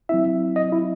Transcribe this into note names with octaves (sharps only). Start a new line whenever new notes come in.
F#3 C4 E4 E5
D#5
E4